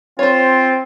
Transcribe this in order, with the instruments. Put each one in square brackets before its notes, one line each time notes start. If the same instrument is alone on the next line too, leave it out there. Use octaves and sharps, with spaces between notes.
[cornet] C4 [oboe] F4 [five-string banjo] C5 C#5